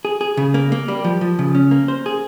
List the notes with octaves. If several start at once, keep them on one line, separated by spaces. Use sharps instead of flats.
G#4
G#4
C#3
A#3
A#3
G3
F3
F3
C#3
C#4
A#3
C5
G#4